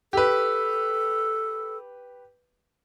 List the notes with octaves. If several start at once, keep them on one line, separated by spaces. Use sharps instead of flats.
G4 A4 B4